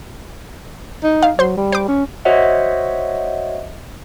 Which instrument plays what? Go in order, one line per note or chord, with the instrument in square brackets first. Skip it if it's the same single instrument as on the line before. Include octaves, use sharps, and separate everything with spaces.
[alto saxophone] D#4
[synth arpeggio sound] F5
[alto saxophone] F#3 [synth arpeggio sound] C5 C6
[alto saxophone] G3
[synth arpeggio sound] C5 D6
[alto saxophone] C#4
[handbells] F#4 C5 C#5 D#5 E5 F#5